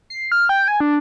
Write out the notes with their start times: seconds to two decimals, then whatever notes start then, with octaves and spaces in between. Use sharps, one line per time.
0.10 C7
0.32 F6
0.49 G5
0.68 G#5
0.80 D4